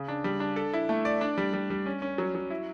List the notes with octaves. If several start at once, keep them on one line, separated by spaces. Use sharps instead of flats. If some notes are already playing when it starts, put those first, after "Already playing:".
Already playing: C#3
D4
G3
D4
A4
E4
A3
D5
D4
G3
G3
G3
C#4
C#4
F#3
F#3
E4